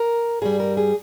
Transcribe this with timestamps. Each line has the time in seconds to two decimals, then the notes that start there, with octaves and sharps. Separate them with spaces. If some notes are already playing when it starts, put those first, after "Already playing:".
Already playing: A#4
0.41 G2 G3 G#4
0.60 A#4
0.77 G#4